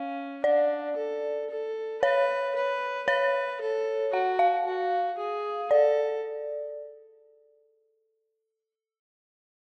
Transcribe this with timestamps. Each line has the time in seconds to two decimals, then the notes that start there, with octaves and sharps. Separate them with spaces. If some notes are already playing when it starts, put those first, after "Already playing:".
Already playing: C#4 F5
0.44 D4 D5
0.96 A4
1.50 A4
2.02 B4 C#5
2.56 B4
3.07 B4 C#5
3.61 A4
4.13 F#4 F#5
4.39 F5
4.66 F#4
5.18 G#4
5.71 A4 D5